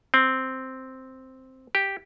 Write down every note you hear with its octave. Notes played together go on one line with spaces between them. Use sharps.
C4
G4